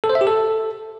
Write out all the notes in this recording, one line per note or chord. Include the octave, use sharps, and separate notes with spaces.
A4
C5
E5
G4
A4